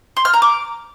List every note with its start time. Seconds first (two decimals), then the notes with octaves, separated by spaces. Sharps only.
0.17 C6
0.25 F6
0.33 A#5
0.42 D6